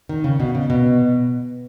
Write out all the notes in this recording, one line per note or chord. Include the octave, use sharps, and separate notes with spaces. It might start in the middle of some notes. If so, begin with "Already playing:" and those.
D#3
C#3
B2
C#3
B2